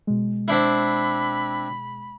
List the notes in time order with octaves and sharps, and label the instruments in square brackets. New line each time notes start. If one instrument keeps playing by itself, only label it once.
[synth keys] B2 G#3
[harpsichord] C4 D4 E4 [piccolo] B5